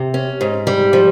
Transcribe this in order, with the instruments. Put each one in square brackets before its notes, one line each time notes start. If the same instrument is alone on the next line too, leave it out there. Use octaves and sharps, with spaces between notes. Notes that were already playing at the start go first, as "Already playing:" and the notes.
Already playing: [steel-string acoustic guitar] C3
C#4
G#2
G3
F3